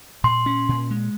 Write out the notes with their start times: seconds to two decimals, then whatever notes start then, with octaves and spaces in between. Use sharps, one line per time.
0.24 A#2 C6
0.46 C#4
0.69 A#2
0.91 G#3